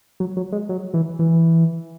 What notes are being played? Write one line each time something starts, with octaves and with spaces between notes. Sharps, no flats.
F#3
F#3
G#3
F#3
E3
E3